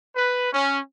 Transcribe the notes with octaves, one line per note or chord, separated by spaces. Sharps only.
B4
C#4